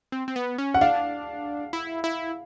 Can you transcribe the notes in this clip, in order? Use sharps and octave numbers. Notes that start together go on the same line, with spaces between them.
C4
C4
B3
C#4
F#5
D4 F5
E4
E4